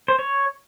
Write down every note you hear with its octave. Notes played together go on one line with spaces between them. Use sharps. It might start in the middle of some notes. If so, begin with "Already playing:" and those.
C5
C#5